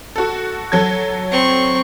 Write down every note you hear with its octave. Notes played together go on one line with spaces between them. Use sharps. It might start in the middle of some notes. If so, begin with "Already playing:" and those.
F#4 A4
F#3 A4 G#6
C4 C#6